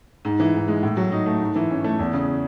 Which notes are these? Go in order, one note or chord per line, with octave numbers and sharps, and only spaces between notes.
G#2
E3
G#2
G#3
A2
F#3
D#4
A3
G#2
E3
C#4
A3
E2
C#3